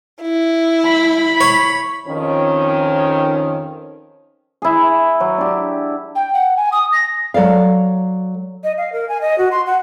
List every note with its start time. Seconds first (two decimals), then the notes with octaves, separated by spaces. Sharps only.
0.22 E4
0.85 B5
1.41 C#5
2.07 F2 D#3 C#4
4.62 E4 G#4
5.20 F#3
5.38 D4 G4
6.15 G5
6.33 F#5
6.57 G#5
6.72 D#6
6.92 A#6
7.34 F#3 A4 D5 F5
8.64 D#5
8.77 F5
8.93 A#4
9.09 G#5
9.21 D#5
9.38 F#4
9.51 C6
9.67 F#5